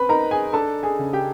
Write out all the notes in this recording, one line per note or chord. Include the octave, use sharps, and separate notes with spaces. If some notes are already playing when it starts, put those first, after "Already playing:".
Already playing: C4 B4 B5
D#4 A#4 A#5
G#4 G#5
D4 A4 A5
G#4 G#5
C#3
G4 G5